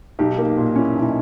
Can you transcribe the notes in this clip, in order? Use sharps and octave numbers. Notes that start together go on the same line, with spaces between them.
B1 D#4 G4
A#3
A#2
C#4 E4
B1 E4
D#4